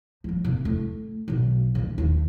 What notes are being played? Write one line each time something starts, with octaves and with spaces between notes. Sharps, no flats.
F3 G3
C3 A#3
A3 E4
B1 B2
C#2 A3
D#2 D#4